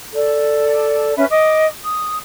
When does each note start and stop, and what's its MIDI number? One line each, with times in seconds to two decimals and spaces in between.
0.13 1.14 69
0.13 1.14 74
1.16 1.24 61
1.16 1.24 71
1.16 1.24 76
1.29 1.65 75
1.29 1.65 86
1.29 1.65 87
1.84 2.17 87